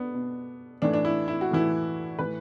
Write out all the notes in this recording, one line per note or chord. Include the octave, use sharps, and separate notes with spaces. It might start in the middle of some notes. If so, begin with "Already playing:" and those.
Already playing: B3 D4
B2
A2 E3 D4
D4
E4
E4
F#4
A2 E3 E4
A2 E3 B4